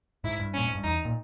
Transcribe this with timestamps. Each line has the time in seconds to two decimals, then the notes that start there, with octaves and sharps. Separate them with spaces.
0.24 G#2 E4
0.39 G2
0.54 A#2 C#4
0.66 G#2
0.75 G2
0.84 E2 D#4
1.05 A#2